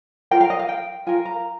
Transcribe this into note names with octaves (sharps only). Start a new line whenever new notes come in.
F4 A#4 G5
F5
D#5
F5
G5
F4 A#4 G#5
A#5